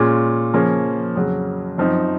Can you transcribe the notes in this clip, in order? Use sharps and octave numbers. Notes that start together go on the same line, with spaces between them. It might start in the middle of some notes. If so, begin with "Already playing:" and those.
Already playing: A#2 G#3 C#4 F4
C#3 F3 A#3 C#4
F2 C#3 F#3
F#2 F3 C4 D#4